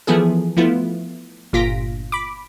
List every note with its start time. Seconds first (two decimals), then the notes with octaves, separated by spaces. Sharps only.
0.07 E3 F3 B3 E4 G#4 A4
0.57 F3 A3 B3 E4 F4
1.53 G1 A#2 F4 A#6 B6 D7
2.12 B5 D6